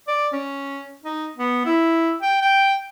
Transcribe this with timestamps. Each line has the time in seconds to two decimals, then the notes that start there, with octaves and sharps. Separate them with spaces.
0.08 D5
0.32 C#4
1.04 D#4
1.36 B3
1.66 E4
2.22 G5
2.42 G5